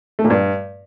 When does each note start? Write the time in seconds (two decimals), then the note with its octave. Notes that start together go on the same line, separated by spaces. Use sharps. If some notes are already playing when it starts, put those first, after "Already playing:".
0.19 A3
0.24 A#2
0.30 G2